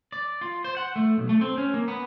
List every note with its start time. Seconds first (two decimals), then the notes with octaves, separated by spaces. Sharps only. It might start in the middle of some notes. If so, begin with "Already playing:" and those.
0.12 D5
0.41 F4
0.64 C5
0.77 F#5
0.96 A3
1.18 B1
1.29 A3
1.41 C4
1.58 C#4
1.74 A#3
1.88 B3